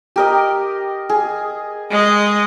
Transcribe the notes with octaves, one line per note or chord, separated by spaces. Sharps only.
G4 A#4 D#5
G#4
G#3 D#5